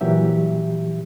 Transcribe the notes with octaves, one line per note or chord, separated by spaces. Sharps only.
A#2 E3 F#3 G4 E5